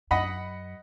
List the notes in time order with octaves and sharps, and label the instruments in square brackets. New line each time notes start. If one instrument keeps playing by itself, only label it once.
[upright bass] F#2 [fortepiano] D#5 F#5 B5